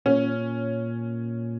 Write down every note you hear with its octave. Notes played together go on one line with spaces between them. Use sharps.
A#2 C#4